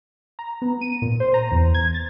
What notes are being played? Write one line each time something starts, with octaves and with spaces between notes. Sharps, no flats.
A#5
B3
D#7
A#2
C5
A#5
E2
G#6
A6